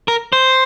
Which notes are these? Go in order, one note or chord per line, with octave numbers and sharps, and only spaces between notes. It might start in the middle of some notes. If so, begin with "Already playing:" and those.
A#4
C5